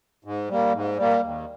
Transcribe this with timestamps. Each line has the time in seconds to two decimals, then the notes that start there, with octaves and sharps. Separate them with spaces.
0.25 G#2
0.49 G3 A#3
0.73 G#2
0.97 G3 A#3
1.21 D#2